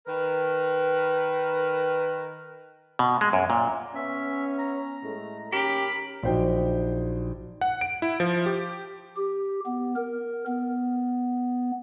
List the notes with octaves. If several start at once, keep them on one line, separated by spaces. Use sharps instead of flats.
D#3 A#4 B4
B2
G#3
F#2
A#2
B3 C#4 E5
A#5
A2 G#3 A3
D#2 C#4 G4 A#4 B5
A#1 F#3 D#4 C5 G5
F#5
D7
E4
F3
G4
G4
B3
A#4
B3